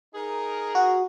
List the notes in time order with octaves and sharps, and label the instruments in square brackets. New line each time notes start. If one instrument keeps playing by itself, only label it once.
[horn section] D#4 G#4 A#4
[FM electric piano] F#4